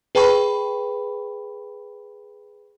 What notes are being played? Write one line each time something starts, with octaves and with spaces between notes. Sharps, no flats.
G#4 B4 G5 A5 B5 C#6